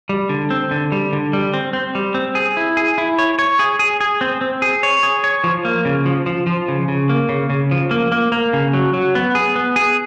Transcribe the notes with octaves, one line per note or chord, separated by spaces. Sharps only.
G3
D3
C4
D3
G3
D3
G3
C4
C4
G3
C4
G#4
E4
G#4
E4
C#5
C#5
G#4
G#4
G#4
C4
C4
G#4
C#5
G#4
C#5
F3
A#3
C#3
F3
F3
F3
C#3
C#3
A#3
C#3
C#3
F3
A#3
A#3
A#3
C#3
F#3
F#3
B3
G#4
B3
G#4